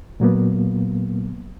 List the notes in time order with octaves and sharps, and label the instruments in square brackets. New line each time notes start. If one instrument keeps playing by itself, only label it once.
[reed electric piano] A#2 F#3 A#3 B3